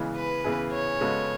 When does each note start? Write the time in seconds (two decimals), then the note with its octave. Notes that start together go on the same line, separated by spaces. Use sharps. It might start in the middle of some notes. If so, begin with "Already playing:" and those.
Already playing: C#3 E3 G#3 B3
0.16 B4
0.44 C#3 E3 B3 E4 G#4
0.73 C#5
1.01 C#3 G#3 B3 F#4 A4